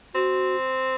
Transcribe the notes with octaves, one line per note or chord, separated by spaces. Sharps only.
C4 F#4